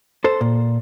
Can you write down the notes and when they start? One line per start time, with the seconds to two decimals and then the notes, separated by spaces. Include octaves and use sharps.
0.24 A4 C5
0.41 A#2